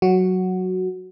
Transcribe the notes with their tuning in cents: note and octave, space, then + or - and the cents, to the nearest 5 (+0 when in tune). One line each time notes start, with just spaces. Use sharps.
F#3 +0 F#4 +0